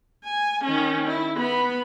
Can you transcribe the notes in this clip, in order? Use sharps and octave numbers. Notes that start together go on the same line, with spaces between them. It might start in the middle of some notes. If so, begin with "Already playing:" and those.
G#5
D#3 C#4
E4
B3 B5